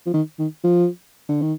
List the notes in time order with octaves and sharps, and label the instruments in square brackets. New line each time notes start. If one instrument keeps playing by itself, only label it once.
[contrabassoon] F3
D#3
D#3
F3
D3
D#3